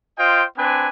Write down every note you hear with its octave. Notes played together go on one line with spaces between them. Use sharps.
F4 C5 D#5 G5
C4 D4 B4 G#5